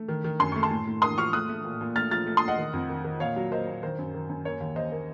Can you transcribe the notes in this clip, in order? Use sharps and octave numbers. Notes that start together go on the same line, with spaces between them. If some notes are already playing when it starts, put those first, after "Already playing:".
Already playing: A3
D#3
D#3
F#2 C6
A3 C#6
A5 C6
A2
A2
A#3 C6 D#6
F3 C#6 F6
A3 D#6 F#6
A3
A#2
A#2
A3 F6 A6
F3 F6 A6
A3
C6 D#6
A3 D#5 F#5
D#3
F2
D#3
D#3
A#2 C#5 F5
F#3
A#3 C5 D#5
A#2
D#3 C5
F#2
D#3
F#2
A#3 C#5
D#2
D#2 C5 D#5
A#3